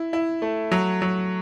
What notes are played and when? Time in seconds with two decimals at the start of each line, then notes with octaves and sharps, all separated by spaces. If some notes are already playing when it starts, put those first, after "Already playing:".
Already playing: E4
0.13 E4
0.42 A3
0.71 F#3
1.02 F#3